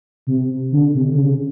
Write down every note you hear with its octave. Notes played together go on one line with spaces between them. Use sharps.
C3
D3
C3
D3
C#3